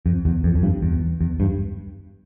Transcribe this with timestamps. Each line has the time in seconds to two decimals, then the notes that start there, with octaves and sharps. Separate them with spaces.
0.06 F2
0.25 E2
0.44 F2
0.56 F2
0.63 G2
0.82 E2
1.21 E2
1.40 G2